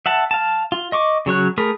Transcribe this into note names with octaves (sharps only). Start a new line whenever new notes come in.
E5 F#5 A5
F5 A5
F4
D#5 C#6 D6
C#3 F#3 C#5 F#6
A3 G#4 A#4 B5